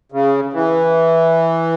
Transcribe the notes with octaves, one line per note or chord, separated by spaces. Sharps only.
C#3
E3